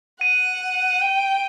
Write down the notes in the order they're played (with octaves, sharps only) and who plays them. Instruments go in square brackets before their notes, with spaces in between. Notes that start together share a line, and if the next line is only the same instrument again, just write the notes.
[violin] F#5 [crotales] D#7
[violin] G5